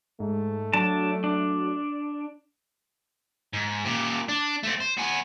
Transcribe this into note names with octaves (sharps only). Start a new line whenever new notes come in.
G#2 A3
F#3 D4 A5
D4
G#2
A#2 G4
D4
A3 C4
C5
B3 G#5